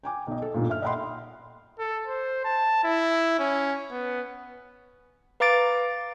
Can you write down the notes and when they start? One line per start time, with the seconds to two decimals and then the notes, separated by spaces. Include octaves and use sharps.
0.03 G5 G#5 D6
0.27 B1 D#5
0.42 A4
0.54 B1 G2 A#2
0.69 E5 F6
0.82 D#5 E5 F#5 G5 B5 C6
1.79 A4
2.07 C5
2.45 A5
2.84 E4
3.39 C#4
3.91 B3
5.40 B4 F5 A#5 D6 A6 D7